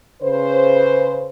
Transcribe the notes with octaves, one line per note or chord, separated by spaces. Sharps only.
C#3 B4 C5